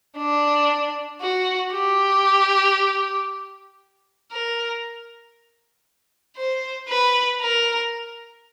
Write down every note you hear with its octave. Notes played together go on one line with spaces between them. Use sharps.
D4
F#4
G4
A#4
C5
B4
A#4